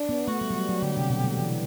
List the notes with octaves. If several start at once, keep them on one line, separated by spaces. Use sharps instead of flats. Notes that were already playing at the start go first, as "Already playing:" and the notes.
Already playing: D4
B3
A3 F#4
G3
F#3
G3
F#3
D3 G4
C3
B2
G3
E3